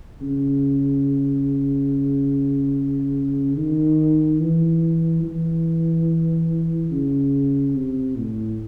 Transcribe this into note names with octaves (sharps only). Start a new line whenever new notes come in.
C#3
D#3
E3
E3
C#3
C3
A2